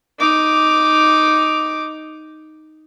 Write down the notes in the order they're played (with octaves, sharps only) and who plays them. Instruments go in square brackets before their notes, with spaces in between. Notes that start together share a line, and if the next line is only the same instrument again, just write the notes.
[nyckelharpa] D#4 D6